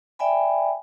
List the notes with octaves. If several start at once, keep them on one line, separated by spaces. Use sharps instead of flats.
D5 E5 G5 G#5 B5